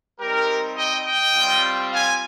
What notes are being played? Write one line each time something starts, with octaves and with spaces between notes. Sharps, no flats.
G3 C4 D#4 G4 A#4
D#5 G5
D#5 G5
G3 C4 F4
F5 G#5